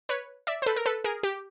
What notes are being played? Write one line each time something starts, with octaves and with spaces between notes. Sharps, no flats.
B4 C#5
D5 E5
C5
A4 B4
A#4
A4 B4
G#4 A#4
G4